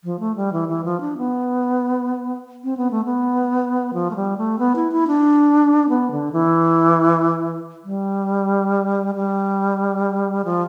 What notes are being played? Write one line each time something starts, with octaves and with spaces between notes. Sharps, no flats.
F3
A3
G3
E3
E3
F3
D4
B3
C4
B3
A3
B3
F3
A3
G3
A3
B3
E4
E4
D4
B3
D3
E3
G3
G3
F3